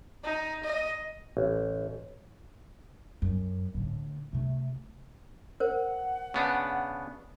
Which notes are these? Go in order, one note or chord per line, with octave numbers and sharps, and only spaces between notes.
D#4
D#5
A1
F#2
A2 D3
C3 A3
A#4 C5 F#5
C#3 B3 D4